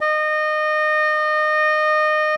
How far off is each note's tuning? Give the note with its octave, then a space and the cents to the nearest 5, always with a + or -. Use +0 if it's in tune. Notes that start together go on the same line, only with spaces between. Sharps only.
D#5 -25